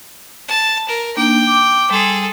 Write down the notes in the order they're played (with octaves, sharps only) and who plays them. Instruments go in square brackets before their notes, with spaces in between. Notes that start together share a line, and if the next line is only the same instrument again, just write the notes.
[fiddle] A5
A#4
[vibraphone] A#3 D4 D#4 [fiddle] G5
[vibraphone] D6
[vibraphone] G3 C6 [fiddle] G#4 A4